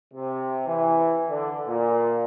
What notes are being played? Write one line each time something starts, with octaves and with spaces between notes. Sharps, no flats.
C3
E3
D3
A#2